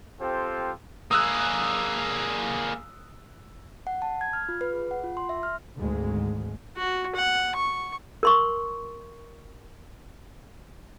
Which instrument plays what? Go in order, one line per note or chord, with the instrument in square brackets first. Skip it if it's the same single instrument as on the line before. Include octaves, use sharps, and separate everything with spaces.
[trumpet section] C4 F4 G4 A4 C5
[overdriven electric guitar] A#3 G#4 [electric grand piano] D#6 E6 F#6
[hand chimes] F#5
A5
G#6
F6
F4
B4
G#4
F#5
F4
C6
E5
F6
[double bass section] G#1 D2 G#2 G#3
[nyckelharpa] F#4
F#5
C#6
[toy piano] A#4 C6 C#6